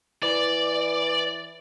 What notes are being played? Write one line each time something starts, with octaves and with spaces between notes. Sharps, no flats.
E3 D5